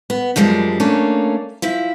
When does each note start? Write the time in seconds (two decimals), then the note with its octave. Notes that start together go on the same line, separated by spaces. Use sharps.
0.10 B3
0.36 F#2 F3 G3 G#3 D4
0.80 A3 A#3 C#4 D4
1.62 F3 E4 E5